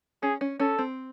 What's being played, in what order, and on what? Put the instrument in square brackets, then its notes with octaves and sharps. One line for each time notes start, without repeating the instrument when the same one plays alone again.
[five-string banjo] C#4 [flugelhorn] G#4
[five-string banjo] C#4
[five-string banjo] C#4 [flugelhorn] A4
[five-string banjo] C4